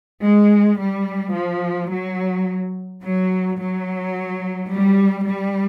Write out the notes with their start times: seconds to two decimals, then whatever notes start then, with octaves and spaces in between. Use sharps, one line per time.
0.23 G#3
0.80 G3
1.34 F3
1.91 F#3
3.03 F#3
3.59 F#3
4.71 G3
5.27 G3